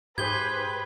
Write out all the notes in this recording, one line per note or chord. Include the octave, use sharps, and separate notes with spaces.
G#2 G4 G#4 B4 C5 G#6 G7